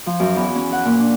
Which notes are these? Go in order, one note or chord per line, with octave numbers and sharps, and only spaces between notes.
F3
F#2
E2
C#4
F#5
A#2
D4